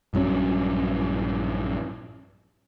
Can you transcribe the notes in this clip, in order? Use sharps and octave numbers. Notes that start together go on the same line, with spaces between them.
A#1 G2 F#3 C#4